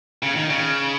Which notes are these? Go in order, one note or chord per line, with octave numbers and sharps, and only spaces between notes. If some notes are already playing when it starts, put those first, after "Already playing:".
C#3
D#3
C#3